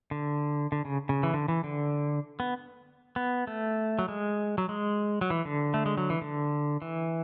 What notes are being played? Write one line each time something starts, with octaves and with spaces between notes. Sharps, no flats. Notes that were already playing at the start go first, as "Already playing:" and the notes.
D3
D3
C#3
C#3
E3
D3
E3
D3
B3
B3
A3
F#3
G#3
F#3
G#3
F#3
E3
D3
A3
G#3
F#3
E3
D3
E3